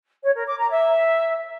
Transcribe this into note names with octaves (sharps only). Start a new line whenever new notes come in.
C#5
A#4
D6
A#5
E5